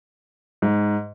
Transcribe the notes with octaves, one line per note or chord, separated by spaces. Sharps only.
G#2